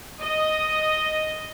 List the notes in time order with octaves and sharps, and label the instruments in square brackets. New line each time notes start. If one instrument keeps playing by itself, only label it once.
[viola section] D#5